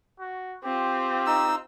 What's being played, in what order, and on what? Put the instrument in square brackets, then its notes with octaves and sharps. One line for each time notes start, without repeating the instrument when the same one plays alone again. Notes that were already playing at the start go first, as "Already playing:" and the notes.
[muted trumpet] F#4
[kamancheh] C4 F4 [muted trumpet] G4
[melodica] D#4 E6